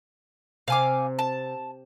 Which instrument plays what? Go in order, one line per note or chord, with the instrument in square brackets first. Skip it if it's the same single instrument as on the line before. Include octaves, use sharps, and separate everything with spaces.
[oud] C3 [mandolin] F5 G#5 D6
[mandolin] A5